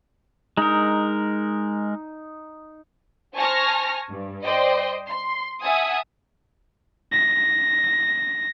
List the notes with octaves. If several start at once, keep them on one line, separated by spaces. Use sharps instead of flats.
G#3 D#4 A#4
C5 G#5 A5 C#6 F6 A#6
G2
C5 D5 D#5 G5 C6
C6
E5 F#5 G#5 A5 D#6
A#6